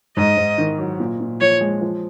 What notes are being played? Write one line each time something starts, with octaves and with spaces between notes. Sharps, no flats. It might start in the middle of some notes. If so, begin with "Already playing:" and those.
G#2 D#5
G#2
D#3
F#3
A#2
A#2
F3 C#5
G#3
F3